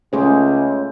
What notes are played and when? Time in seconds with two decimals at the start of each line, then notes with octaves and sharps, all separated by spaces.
0.13 C#2 A3 C#4 G#4 C5